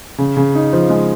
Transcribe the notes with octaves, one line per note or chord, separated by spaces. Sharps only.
C#3
C#3
D#4
F3
G#3